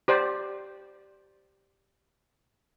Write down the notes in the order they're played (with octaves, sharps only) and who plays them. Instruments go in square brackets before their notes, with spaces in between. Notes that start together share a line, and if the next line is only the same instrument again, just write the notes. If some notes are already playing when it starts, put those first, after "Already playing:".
[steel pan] G4 C5 D5